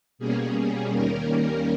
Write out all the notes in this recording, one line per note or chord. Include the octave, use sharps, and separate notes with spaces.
B2 G3 A#3 C#4 G#4
D#2 D#3 G3 A#3 C#4 A#4